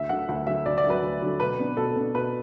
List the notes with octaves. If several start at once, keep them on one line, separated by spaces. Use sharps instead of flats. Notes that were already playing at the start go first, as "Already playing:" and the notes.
Already playing: D2 E5
D3 F#3 F#5
D2 F#5
D3 F#3 E5
D2 D5
D5
D3
F#3 B4
D2
D3 F#3
B2 B4
B3 D4
B2 A4
B3 D4
B2 B4